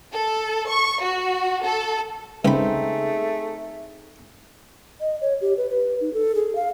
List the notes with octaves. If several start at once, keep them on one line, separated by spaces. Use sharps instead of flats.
A4
C#6
F#4
A4
C#2 A3 C4 D#4 G#4 B5
D#5
C#5
G4
B4
B4
D#4
A4
G#4
F5